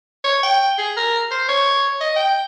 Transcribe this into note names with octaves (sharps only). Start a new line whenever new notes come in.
C#5
G5
G#4
A#4
C5
C#5
D#5
G5